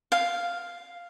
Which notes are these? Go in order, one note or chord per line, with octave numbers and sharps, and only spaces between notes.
F5